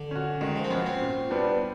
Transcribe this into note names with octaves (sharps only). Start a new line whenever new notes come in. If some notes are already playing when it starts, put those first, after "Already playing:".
Already playing: D3
C#4 F#4
D#3 G#3
F3
C4
B3 C#4 F#4
C4
A#2
G3 B3 D4